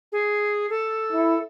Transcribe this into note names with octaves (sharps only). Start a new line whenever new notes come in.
G#4
A4
E4